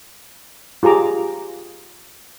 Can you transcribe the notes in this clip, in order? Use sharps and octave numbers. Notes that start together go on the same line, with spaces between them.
F4 G4 G#4 A#5 D6